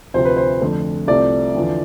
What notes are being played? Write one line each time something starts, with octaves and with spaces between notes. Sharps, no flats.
D2 C3 F3 C5
B4
C5
F2 D3 A3
C2 C3 F3 A3 D5
E2 D3 F3